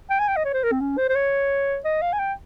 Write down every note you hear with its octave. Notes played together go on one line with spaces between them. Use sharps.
G5
G#5
G5
D#5
C#5
C5
A#4
C4
C#4
C5
C5
C#5
D#5
F5
G#5
G5